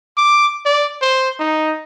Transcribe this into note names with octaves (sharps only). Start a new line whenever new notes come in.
D6
D5
C5
D#4